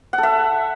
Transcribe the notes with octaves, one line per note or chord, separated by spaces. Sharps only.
F#5
A4
E5